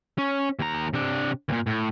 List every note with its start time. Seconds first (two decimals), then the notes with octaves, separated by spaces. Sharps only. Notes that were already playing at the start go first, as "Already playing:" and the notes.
0.18 C#4
0.59 D#2 A#5
0.94 C3 D4
1.49 D#2 A#2
1.67 A2